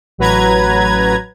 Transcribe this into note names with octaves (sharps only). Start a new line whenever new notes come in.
A1 F#3 B4 A#5 G#6